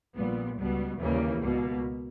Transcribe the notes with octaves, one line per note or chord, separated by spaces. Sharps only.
A#1 A#2 G3 B3
C#2 B2 G3 B3
D#2 C#3 E3 G3 A#3
C#2 B2 A#3